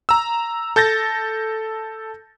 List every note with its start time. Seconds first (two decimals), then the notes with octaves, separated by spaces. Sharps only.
0.09 A#5 E6
0.76 A4 G6 A6 A#6